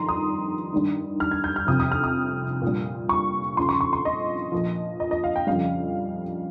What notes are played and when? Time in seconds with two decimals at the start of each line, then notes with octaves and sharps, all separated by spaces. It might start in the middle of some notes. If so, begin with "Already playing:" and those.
Already playing: F2 D#3 G3 A#5 C6
0.09 D#6
0.73 G2 D#3 G3
1.20 F6
1.31 G#6
1.44 G6
1.56 F6
1.67 F2 C3 F3 D#6
1.80 D#6
1.92 F6
2.04 D#6
2.62 A#2 G3
3.09 C#6
3.57 F2 C#3 F3 C6
3.69 C#6
3.81 C#6
3.93 C6
4.05 D#5
4.52 A#2 F3
5.00 D#5
5.11 D#5
5.24 F5
5.36 G5
5.47 F2 C#3 G3 F5